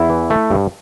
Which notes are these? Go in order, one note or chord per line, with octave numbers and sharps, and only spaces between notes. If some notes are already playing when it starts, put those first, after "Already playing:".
Already playing: E2 E4
E3
A3
G2